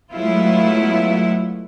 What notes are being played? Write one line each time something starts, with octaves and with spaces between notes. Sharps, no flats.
F#3 G#3 A3 B3 E4 F4